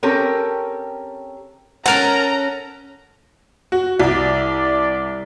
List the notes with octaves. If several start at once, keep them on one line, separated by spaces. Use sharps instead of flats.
C4 C#4 G4 A4 A#4
C#4 A4 A#4 F#5 A5 A#5
F#4
C2 D5